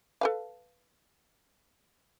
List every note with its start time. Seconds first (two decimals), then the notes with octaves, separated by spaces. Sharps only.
0.21 A4 B4 F5